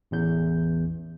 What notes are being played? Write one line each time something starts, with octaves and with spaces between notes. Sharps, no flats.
A1 E2 G6